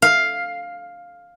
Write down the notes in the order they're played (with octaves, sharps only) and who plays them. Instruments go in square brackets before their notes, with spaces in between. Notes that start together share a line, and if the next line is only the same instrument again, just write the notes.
[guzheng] F5